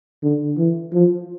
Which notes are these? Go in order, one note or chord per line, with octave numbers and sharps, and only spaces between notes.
D3
E3
F3